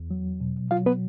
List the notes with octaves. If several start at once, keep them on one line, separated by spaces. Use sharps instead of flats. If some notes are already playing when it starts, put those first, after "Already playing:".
Already playing: E2
F#3
B2
F#3 F4 F5
B3 B4